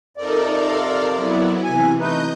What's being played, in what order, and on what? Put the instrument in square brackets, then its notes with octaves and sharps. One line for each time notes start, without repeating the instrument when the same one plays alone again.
[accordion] F2 C3 D5 [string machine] D#4 A4 A#4
[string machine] A4 A#4 F5
F#3 B3 E4
[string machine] C3 E3 [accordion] G#5
[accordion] A3 D#4 B4 [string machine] D#5 G6